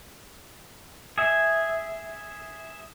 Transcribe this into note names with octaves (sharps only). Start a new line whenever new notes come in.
G#4 E5